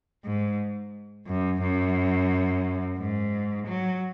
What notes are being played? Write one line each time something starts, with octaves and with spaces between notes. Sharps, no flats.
G#2
F#2
F#2
G#2
F#3